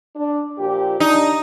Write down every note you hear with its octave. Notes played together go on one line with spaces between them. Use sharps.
D4
A#2 F3 G4
D4 D#4